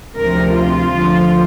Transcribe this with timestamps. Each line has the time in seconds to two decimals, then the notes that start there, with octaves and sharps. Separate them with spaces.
0.16 D2 C3 F3 C4 A#4
0.54 F4
0.93 D2 D3 F3